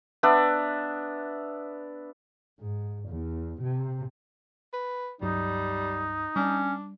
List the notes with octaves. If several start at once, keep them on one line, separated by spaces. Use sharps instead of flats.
B3 D4 D5 E5
G#2
E2
C3
B4
C#2 G2 F#3 G3 D#4
G3 C#4 D4